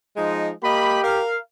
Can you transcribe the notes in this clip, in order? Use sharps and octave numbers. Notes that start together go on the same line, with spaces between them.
F3 G#3 D#4
A#3 G4 D#5 B5
A#4 F5